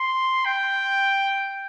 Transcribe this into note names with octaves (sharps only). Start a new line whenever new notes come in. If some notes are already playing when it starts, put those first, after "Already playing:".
Already playing: C6
G5